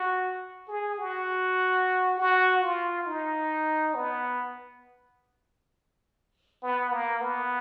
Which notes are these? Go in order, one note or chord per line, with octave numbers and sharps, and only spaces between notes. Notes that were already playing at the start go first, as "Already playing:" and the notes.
Already playing: F#4
G#4
F#4
F#4
F4
D#4
B3
B3
A#3
B3